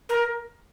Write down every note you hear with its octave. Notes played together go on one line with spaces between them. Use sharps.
A#4